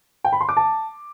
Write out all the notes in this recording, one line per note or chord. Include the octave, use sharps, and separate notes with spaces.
G5
B5
C6
D6
A5